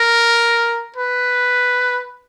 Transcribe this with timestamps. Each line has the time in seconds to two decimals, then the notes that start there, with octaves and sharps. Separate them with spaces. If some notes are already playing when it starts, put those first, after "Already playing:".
Already playing: A#4
0.96 B4